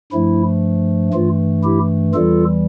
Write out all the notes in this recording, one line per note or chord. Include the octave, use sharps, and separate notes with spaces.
G2 F3 A3 E4
G2 E3 A3 F4
E4 G4
E2 E3 G3 F4 A4